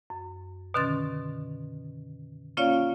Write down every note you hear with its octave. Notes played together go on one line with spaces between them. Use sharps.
F#2
B2 D3 D#3 C#4 C6 A6
A#3 C#4 F4 C#5 D5 F5